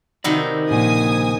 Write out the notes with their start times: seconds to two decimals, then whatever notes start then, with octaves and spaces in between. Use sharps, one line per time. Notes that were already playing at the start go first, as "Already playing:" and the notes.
0.24 C3 D#3 B3 F#4 D5
0.70 A#1 C#3 A#3 G#5 D#6